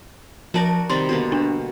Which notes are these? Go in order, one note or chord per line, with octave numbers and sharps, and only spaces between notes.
F3 F#4 A#4 D5 A5 A#6
C3 D#3 G3 C6 A6
B2 D3 A#3
D4